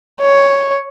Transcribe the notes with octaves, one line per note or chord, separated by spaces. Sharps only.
C#5